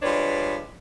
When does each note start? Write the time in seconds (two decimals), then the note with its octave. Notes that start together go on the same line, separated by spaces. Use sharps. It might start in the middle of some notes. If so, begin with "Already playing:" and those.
0.02 F3 G3 G#3 D4 B4 C#5